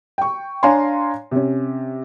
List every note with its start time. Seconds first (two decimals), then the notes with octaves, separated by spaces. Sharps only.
0.18 G5 C#6
0.63 D4 C#5 F5 G#5 A#5 C6
1.31 C3 C#4